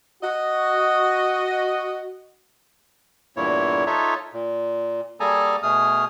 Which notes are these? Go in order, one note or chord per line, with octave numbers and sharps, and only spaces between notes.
F#4 D#5
E2 G2 A#2 A#3 E4 C#5
D#4 F4 A4 C#5 E5
A#2
G3 A#3 G#4 A4 G#5 A#5
B2 A3 G#4 D#6 F6